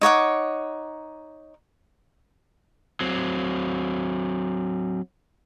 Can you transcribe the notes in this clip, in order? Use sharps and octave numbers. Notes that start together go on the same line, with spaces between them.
D#4 C#5 F#5 D6
F#3 C4